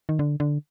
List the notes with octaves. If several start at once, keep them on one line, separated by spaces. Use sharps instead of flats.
D#3
D3
D3